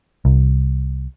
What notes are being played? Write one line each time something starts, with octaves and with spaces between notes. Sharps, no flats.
C2